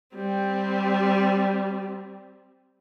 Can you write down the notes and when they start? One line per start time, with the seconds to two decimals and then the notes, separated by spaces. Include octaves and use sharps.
0.15 G3 C4